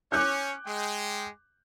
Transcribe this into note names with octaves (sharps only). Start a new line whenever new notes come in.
C#4 C#5 D6 F#6 G6
G#3 G5